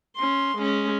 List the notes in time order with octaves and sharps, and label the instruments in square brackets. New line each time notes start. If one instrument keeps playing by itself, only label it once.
[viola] C#4 C6
G#3 C#4